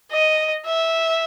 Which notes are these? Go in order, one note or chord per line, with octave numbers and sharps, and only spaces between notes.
D#5
E5